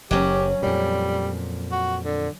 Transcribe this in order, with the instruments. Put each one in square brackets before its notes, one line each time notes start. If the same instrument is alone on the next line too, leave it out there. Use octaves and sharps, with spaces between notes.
[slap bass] F#1 [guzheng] F#3 C#4 [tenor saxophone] G4
[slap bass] F2 A#2 [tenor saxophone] G3
[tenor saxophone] F#4
D3